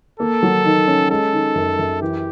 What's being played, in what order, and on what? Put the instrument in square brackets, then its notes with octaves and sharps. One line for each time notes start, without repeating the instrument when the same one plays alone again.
[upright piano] A#3 [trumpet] A4
[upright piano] F#3
D#3
C#4
[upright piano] G#3 [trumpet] A4
[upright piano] D#3
F#2
F#2
[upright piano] E3 [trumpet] G4